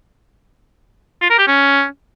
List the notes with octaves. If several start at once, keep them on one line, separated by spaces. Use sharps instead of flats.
F4
A#4
G4
C#4